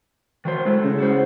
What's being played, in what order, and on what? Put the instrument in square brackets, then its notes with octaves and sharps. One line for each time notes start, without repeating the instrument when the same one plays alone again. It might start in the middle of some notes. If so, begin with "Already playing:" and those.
[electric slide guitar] D#3 F#3 C5
G#3 A3 E4
[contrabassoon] C#3
[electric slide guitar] E4 F#4 C5